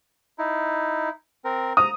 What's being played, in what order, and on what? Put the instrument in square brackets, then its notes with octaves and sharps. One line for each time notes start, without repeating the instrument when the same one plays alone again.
[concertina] D#4 E4
C4 A#4
[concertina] A#5 [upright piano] D#6